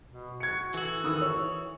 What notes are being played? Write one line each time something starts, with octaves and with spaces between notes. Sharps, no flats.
B2
F#4 G#6 C#7
E3 F#4 A4
D#3 D#6 E6
C#5